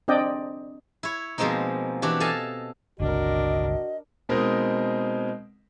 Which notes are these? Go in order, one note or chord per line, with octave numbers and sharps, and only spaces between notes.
C4 D4 D5 D#5 G5
E4 C#5
B2 F3 G#3 A#3 C4 D#4
E3 D4 F#4 G4
A4 D#5 F5 G#5 A5
G1 C#2 C3 D4 F#4 A#4 D#5
B2 G#3 C4 D#4 A#4